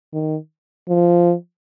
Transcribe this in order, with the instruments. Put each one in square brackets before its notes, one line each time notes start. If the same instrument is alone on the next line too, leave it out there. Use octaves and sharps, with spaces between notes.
[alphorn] D#3
F3